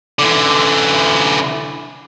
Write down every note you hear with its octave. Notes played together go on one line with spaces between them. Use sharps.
D3 E3